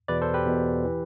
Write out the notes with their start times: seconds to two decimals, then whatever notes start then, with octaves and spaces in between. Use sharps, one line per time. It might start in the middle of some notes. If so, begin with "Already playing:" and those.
0.08 E2 B2 B4 D5
0.22 A4 C5
0.34 G4 B4
0.47 E2 B2
0.85 E3